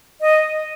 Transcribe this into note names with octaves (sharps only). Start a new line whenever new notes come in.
D#5